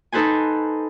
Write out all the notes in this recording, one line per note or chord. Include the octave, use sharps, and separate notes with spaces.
D#4 A4 B4 C5 G#5